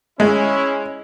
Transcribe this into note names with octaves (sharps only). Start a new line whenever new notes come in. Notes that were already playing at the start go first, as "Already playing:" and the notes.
G#3 C#4 E4